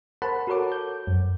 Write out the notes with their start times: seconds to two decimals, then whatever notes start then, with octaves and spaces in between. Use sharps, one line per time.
0.22 A#4 C5 F#5 A5 B5
0.47 F#4 A4 A#4 C#5 F#5 D6
0.72 G6
1.07 F#2